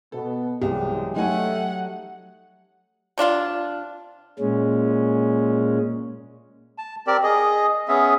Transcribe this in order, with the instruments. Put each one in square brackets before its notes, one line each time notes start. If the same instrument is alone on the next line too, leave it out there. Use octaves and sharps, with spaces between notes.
[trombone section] B2 B3 [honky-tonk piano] A4
[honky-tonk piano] C2 [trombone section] E3 F#3 G#3 [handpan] G4
[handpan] F#3 [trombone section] A3 [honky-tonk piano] D#4 G#5 [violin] F#5
[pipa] C3 D4 F4 F5
[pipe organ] A#2 G#3 C#4
[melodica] A5
C4 G4 A#4 D5
G#4 D#5
B3 C#4 G#4 E5